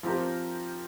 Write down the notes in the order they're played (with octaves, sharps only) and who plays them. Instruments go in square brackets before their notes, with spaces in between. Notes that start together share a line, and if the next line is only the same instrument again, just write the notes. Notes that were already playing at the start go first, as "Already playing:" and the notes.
[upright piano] F3 C4 G4 A#4